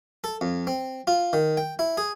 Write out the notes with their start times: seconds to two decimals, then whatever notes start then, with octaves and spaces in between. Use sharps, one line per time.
0.24 A4
0.41 F2
0.67 C4
1.07 F4
1.33 D#3
1.57 G5
1.79 E4
1.97 G#4